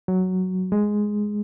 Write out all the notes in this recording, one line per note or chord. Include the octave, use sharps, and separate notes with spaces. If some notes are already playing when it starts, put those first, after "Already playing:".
F#3
G#3